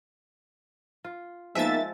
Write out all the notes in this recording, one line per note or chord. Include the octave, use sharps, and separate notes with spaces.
F4
F3 G#3 A#3 B3 D#4 E5 A6